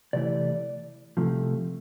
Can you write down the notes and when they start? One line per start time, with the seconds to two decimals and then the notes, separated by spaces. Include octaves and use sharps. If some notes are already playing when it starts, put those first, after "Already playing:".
0.13 C3 E3 A3 E4 D5
1.17 C2 C3 F3 A3